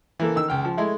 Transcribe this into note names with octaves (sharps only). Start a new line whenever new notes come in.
E3 A#3 A4
D#3 E6
C#2 G5 F6
F3
G#3 A3 E4